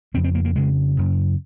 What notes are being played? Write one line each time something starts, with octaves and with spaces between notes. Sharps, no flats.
F2 C#3 C4
C4
A#3
A#3
F2 C#3 G#3
F#2 C#3